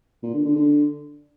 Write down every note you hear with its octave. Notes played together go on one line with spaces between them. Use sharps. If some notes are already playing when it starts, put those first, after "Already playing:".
A#2
D3
D3
D3